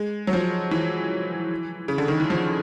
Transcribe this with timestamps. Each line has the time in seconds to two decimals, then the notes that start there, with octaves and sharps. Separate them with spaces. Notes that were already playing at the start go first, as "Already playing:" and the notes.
Already playing: G#3
0.27 F#3
0.33 F3
0.71 E3
1.88 C#3
1.98 D3
2.08 D#3
2.20 E3
2.30 F3